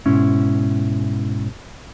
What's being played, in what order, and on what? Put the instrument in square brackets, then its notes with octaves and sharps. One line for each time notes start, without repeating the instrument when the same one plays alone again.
[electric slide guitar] G#2 B2 C#4 E4